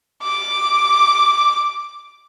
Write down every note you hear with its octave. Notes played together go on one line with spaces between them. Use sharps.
D6